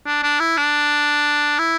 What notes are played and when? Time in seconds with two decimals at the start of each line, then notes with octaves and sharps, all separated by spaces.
0.06 D4
0.23 D4
0.40 E4
0.57 D4
1.59 E4